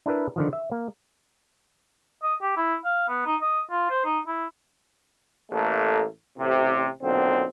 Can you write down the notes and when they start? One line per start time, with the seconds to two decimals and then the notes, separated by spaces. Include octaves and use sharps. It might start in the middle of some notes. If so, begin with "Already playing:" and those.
0.06 D4 E4 A#4 B4 E5
0.36 D3 D#3 F3
0.53 E5
0.72 A#3
2.23 D#5
2.42 G4
2.57 E4
2.85 F5
3.09 B3
3.26 D#4
3.42 D#5
3.71 F4
3.90 C5
4.05 D#4
4.27 E4
5.51 A1 A3 A#3 A4
6.38 A1 C3
7.03 B1 A#2 D3 C4